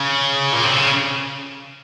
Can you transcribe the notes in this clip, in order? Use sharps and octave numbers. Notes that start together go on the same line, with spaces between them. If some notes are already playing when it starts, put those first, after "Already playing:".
Already playing: C#3
A#2
C3
C#3